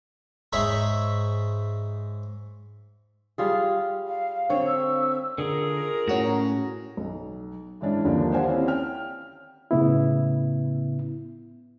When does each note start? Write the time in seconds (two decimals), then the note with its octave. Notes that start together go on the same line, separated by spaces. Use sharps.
0.53 G#2 C#5 D#5 E5 A#5 B5
3.38 G3 F4 G#4
4.08 F5
4.49 D3 C4 C#5
4.67 E6
5.38 D3 F4 G#4 A#4
6.08 A2 C#4 F#4 A#5
6.97 B1
7.81 G#2 E3 C#4 D4
8.04 D#2 D3 D#3 F3 A#3 D4
8.32 G4 C5 D5 F5 F#5 G#5
8.47 C4 C#4 E4
8.68 G5 F6
9.71 A2 C#3 B3 E4